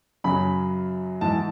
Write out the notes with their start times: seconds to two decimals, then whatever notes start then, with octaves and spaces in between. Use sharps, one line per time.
0.24 F#2 C#3 F#3 B5
1.21 G#2 E3 A5